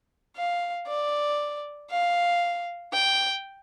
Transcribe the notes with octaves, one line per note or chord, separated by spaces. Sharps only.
F5
D5
F5
G5